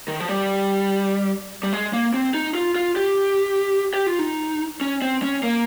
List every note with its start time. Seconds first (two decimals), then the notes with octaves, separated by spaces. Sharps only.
0.08 D#3
0.20 F3
0.29 G3
1.63 G3
1.73 G#3
1.93 A#3
2.14 C4
2.34 D#4
2.55 F4
2.75 F4
2.96 G4
3.94 G4
4.07 F4
4.19 D#4
4.81 C#4
5.02 C4
5.23 C#4
5.43 A#3